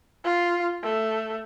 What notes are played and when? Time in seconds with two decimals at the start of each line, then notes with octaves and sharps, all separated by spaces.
0.24 F4
0.83 A3